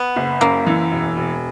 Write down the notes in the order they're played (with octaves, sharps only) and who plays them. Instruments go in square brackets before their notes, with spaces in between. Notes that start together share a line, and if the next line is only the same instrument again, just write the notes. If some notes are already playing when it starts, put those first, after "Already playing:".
Already playing: [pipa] B3
[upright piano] F#1
[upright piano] F#2 [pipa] A#3
[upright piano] E3
E1
E1